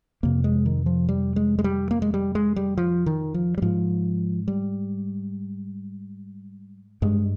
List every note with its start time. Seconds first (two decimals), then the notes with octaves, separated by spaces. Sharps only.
0.23 F2 C3 A#3
0.44 G#3
0.66 D#3
0.86 F3
1.09 G3
1.36 G#3
1.59 G#3
1.64 G3
1.91 A#3
2.02 G#3
2.14 G3
2.35 G#3
2.56 G3
2.78 F3
3.06 D#3
3.34 F3
3.58 G3
3.62 G#2 F3
4.48 G3
7.02 G2 G#3